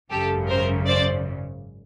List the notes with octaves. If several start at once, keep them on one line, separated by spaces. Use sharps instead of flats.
G#1 F#2 C#3 G4 A4
A#4 C5
C5 D5